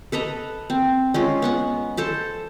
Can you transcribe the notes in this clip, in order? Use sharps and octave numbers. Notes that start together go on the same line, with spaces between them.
A4 B4 D#5 A#5
C4
G#3 C#4 F4
B3 F#5 G#5
A4 C5 A5